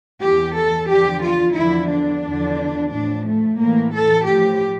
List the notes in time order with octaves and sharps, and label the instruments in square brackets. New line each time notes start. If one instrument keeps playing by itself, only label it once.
[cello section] E2 E3 G4
A4
E2 D3 F3 G4
F4
E2 D3 F3 E4
D4
E2 D3 F3
A2 F3 D4
A3
A2 E3 A#3
A4
A2 F3 G4